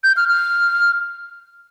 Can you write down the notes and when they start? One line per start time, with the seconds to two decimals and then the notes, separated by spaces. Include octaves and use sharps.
0.04 G6
0.17 F6
0.29 F6